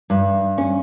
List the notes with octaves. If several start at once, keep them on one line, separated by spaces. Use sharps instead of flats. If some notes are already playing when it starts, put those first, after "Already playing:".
G2
C#4